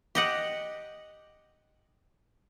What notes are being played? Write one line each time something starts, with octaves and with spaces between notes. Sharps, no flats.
G4 D#5 F#5